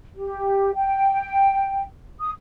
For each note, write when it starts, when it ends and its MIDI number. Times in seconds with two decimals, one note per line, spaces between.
0.15 0.74 67
0.75 1.83 79
2.20 2.31 87